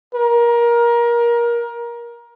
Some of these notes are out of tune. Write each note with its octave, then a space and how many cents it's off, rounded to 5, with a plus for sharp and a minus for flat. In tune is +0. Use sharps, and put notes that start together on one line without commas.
A#4 +20